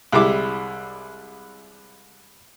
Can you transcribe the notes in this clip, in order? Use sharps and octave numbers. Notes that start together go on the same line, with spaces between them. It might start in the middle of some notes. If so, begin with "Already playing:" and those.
C2 G3 G#3 E4 D6